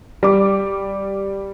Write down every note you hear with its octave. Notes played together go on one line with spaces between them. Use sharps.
G3 D6